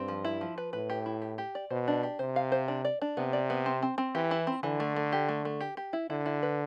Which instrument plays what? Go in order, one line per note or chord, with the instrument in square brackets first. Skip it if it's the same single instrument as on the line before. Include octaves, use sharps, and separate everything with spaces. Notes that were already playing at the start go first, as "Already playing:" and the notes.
Already playing: [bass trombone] G2 [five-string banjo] C4
[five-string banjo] F3
E4
F3
B4
[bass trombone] A2 [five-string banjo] B4
[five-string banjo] G4
E4
G4
G4
D5
[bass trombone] B2 [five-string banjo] C5
[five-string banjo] D4
G4
[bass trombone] C3 [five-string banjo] C5
[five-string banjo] F5
C5
D4
D5
D4
[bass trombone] C3 [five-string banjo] B3
[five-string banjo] D5
B3
C4
C4
C4
[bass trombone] E3 [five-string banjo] G4
[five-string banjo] E4
C4
[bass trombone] D3 [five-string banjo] E3
[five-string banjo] A3
A3
G4
A3
A3
G4
G4
E4
[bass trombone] D3 [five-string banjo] E4
[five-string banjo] E4
B4